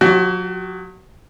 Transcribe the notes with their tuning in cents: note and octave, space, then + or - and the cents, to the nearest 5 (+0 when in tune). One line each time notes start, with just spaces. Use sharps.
F#3 -35 F#4 +40